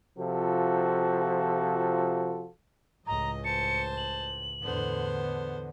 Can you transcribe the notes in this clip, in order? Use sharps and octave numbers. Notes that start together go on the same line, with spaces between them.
C3 F3 F4 F#4 A4
C#2 A2 D#5 A#5
C5 A5 C#7
F#7
E2 A2 D3 B3 C5